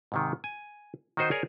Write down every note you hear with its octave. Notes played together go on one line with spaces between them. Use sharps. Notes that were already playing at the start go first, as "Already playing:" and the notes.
G#2 C3 D#3
G#5
D#3 D#4 F#4 C5 D#5
G#4 A#4 C#5 D5 G#5